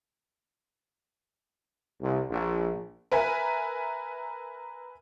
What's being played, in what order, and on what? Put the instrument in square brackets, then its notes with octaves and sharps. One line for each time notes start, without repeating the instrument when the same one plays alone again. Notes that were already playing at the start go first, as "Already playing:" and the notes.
[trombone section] C2
A#1
[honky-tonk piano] A#4 B4 E5 G#5